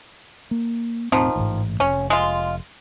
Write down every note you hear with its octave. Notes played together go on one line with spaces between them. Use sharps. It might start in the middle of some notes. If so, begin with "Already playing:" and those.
A#3
E1 A2 D#3 F3 C4
A1 G#2
F1 C#4
G#3 F4